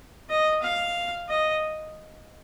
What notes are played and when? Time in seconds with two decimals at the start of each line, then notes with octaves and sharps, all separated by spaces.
0.29 D#5
0.62 F5
1.29 D#5